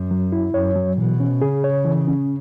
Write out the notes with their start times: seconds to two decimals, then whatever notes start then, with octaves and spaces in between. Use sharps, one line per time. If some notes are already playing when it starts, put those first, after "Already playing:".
Already playing: F#2
0.11 F#3
0.32 E4
0.54 F#2 C#5
0.76 F#3
0.98 B2 E3
1.20 C#4
1.42 C#3 G#4
1.64 C#5
1.85 E3
2.08 C#4